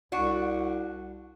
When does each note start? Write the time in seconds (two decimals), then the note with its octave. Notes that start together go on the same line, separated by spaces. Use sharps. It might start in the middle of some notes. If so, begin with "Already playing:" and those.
0.12 C2 D4 F#4